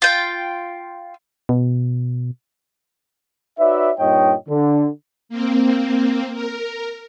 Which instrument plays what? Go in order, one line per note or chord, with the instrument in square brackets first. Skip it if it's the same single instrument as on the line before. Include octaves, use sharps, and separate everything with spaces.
[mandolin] F4 G5
[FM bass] B2
[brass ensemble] D#4 F#4 B4 C#5 D5 E5
G2 A#2 D#4 C#5 D#5 G5
D3
[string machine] A#3 C4
A#4